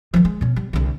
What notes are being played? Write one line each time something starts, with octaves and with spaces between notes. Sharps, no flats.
D#3 F3
G#3
B2 C#4
G3
C2 D3